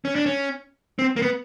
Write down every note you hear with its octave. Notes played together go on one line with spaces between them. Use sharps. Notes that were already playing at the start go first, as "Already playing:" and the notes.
C#4
D4
C#4
C4
A#3
B3